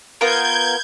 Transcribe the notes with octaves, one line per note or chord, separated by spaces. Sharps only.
B3 F4 A#4 G6 G#6